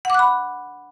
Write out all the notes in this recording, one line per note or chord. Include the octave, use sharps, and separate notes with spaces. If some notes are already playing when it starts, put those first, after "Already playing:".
F#5 B5 D6 F#6